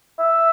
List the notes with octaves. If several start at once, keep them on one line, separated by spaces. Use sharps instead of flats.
E5